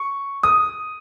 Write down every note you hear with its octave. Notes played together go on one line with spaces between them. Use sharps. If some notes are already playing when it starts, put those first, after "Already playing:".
Already playing: C#6
D#6